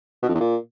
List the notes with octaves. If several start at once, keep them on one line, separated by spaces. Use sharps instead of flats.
B2
F2
E2
A#2